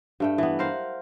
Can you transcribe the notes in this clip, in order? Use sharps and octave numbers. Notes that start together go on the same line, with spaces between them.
G2 A3 G5
E3 B3
A#4 C5 F5 F#5